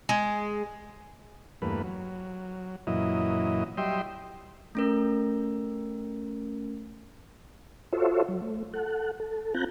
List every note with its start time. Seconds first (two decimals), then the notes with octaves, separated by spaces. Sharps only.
0.09 G#3
1.62 E2 G2 A3 A#3 B4
1.84 F#3
2.87 F#2 A#2 E3 F#3 E4 D#5
3.77 F#3 G3 D#5 E5 G5 C6
4.75 A3 C#4 A#4
7.93 F4 F#4 A4 C5 C#5 E5
8.28 F#3
8.42 A3
8.74 A4 F#5
9.20 A4
9.54 C4 F4 A5 A#5 F#6 G6